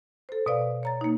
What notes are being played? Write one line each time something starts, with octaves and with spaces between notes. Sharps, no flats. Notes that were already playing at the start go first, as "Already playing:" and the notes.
A4 C5
B2 B4 D5 F5
C#5 A#5 A6
A#3 D#4